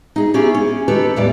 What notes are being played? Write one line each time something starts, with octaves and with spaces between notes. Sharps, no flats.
D#4 G#4
B3 C#4 E4 G4 G#4
C#4
D#3 G4 A4 B4 C#5
E2 A2 E3 G3 D5